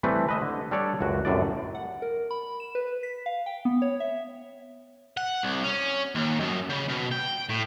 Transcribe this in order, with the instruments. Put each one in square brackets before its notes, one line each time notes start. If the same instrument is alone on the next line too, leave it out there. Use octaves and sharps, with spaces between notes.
[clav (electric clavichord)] E3 G3 A3 C4 B4
B4 D#5 E5
D3
G3 D4 A4 C#5 D5
C#2 F#2 F#4
C2 F#2 A2 D5
[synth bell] F#5
A#4
B5
E7
B4
B6
F5
G5
B3
C#5
E5
[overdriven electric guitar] F#5
C2
C#4
D#2
F#2
C#3
B2
G5
A2